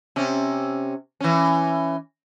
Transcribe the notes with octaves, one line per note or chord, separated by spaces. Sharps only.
C3 C#4
E3 C#4